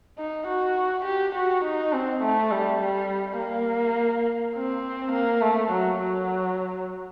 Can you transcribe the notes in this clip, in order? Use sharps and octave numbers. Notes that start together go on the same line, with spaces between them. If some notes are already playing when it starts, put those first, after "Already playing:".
D#4
F#4
G4
F#4
D#4
C4
A3
G3
G3
A#3
C4
A#3
A3
F#3
F#3